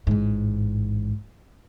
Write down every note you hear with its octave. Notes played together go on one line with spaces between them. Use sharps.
A1 G#2